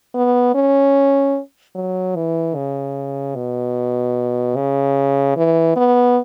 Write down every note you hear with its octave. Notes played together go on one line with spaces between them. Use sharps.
B3
C#4
F#3
E3
C#3
B2
C#3
E3
B3